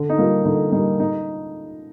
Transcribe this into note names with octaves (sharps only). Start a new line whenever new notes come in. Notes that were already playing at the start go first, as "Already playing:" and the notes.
Already playing: D3
D#4
G3 A#3 F4
D3 D#4
G3 A#3 D#4
D#4